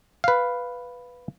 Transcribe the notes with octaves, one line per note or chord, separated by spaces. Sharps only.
B4 F5